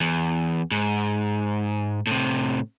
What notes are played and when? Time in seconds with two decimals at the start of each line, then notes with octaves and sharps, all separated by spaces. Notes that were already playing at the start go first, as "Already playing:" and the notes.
0.01 E2
0.71 G#2
2.07 A2 C3